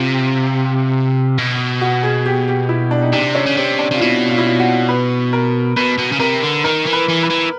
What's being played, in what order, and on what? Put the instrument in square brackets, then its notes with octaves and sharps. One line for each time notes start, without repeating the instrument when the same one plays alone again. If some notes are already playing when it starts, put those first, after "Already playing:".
Already playing: [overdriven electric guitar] C3 [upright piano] F4
[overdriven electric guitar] B2
[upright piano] F#4
G#4
G4
G4
E4
D4
D#4
[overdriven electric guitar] C3 [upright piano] D4
[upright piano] C#4
[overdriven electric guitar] C#3
[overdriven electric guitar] C3 [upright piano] C4
[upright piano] D4
[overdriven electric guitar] C3 [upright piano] F4
[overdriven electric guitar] B2 [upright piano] E4
[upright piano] F4
E4
F4
F#4
B4
A#4
[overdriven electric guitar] B2 [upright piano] B4
[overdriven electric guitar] B2
C#3
[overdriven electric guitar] C3 [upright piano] A#4
[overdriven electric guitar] D3
[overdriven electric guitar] D#3 [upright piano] A#4
[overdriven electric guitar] E3
[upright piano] B4
[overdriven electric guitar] E3
[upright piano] B4
[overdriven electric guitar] E3